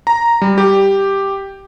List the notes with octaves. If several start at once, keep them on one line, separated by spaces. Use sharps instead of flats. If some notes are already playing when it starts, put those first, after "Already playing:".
A#5
G3
G4